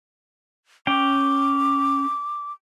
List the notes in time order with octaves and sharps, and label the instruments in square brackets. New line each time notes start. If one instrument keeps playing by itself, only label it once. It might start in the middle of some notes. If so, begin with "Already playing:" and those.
[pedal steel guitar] C#4 G5 [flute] D6